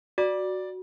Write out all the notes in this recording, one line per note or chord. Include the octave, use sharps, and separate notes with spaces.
F#4 D5